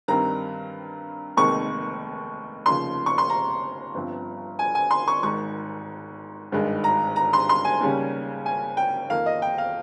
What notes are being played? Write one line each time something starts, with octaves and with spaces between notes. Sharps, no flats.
G2 D#3 G3 C4 A#5
F1 D#2 D#3 G#3 C4 C#6
F1 D#2 C#3 F3 C6
C#6
C6
A#5
G1 G2 F3 C4
G#5
G#5
C6
C#6
G#1 G#2 D#3 C#6
G#1 G2 D#3 G#3
A#5
A#5
C6
C6
G#5
D#2 C#3 G3 C#4
G#5
G5
F2 D#3 A#3 F5
D#5
G5
F5